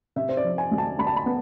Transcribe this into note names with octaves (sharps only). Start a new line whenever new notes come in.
C3 E5
C5
D5
F3
G#5
D2
A5
D2 B5
A5
B5
B3